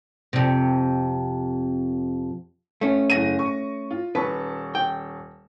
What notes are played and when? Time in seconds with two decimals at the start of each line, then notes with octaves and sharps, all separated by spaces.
0.33 F2 C3
2.81 A3 C#4
3.10 F#1 A#6 D#7
3.39 C#6
3.91 F4
4.15 D#1 B4 A5 C#6
4.75 G5